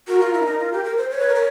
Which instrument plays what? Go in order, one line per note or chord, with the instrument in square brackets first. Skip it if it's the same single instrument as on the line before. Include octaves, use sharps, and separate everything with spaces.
[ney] F#4 [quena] A#4
[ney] F4
E4
D4
D#4
F4
G4
A#4
C5
[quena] C5 [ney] C#5
[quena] B4
A#4
[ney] C#5